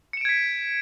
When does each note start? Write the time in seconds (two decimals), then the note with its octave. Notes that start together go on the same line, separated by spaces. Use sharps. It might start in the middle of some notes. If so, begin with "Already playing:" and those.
0.13 C#7
0.17 E7
0.21 D7
0.25 G#6
0.29 B6